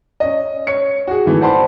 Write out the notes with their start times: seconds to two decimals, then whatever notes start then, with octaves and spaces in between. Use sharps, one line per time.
0.20 C#4 D#5
0.67 C#5 C#7
1.07 F#4 G#4
1.25 D#3 E3 A3
1.41 C5 D5 F#5 A5 B5 C6